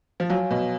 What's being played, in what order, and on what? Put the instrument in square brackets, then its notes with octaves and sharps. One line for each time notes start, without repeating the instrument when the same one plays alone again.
[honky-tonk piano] F3
[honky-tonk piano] F#3 [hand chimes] F#4 C#5 F5 G#5
[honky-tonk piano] B2